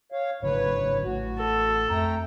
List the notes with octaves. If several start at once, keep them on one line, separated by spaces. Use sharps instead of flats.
C#5 F5
G#1 C#3 F#3 B4 C#5
A1 A3 F#4
A4
F2 A3 G5 A#5